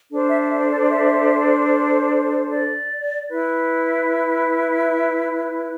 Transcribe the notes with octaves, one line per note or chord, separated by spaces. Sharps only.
D4 A4 C5
E5
E5
D5
E5
D5
E4 B4
E5